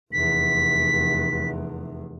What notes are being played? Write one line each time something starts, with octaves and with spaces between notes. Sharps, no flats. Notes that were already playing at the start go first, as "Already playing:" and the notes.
F1 E2 B6